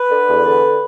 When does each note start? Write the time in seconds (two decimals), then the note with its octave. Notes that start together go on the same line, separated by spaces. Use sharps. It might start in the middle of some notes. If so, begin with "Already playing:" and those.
Already playing: B4
0.11 D3
0.28 E2
0.46 D3